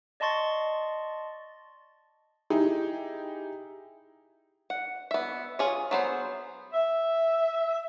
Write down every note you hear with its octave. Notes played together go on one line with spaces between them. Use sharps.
D5 D#5 A5 C6 C#6 A6
D#4 E4 G4 G#4
F#5
B3 E5
F4 G#4 C#5
F#3 B3 C5
E5